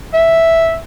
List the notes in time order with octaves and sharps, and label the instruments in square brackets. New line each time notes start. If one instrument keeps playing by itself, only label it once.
[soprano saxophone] E5